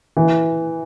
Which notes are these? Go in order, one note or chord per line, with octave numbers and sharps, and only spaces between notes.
E3